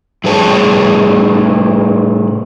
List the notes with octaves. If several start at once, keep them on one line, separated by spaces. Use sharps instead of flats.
A2 G3 G#4 B4 C#5 A5